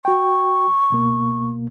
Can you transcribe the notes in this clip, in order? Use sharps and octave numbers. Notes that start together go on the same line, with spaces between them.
F#4 G5 C#6
C#2 B2 A#3